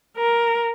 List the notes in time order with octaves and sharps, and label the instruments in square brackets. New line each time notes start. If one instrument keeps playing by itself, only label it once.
[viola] A#4